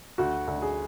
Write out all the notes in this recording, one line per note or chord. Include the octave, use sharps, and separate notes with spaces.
D2 F#4
D2
G#4